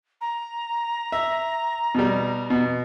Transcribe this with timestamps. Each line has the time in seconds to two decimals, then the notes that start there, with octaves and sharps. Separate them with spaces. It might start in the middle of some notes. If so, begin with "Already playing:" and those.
0.21 A#5
1.12 E5
1.95 B2 G3
2.50 B2